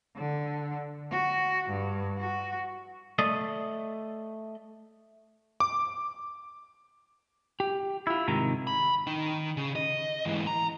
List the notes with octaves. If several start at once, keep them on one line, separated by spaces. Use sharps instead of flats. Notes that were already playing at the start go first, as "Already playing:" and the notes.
D3
F#4
G2
F#4
A3 D5 D#5
D6
G4
E4 F4
G#2 C3 D#3 A#5
B5
D#3 D#4
C#3
D#5
G#2 E3
A#5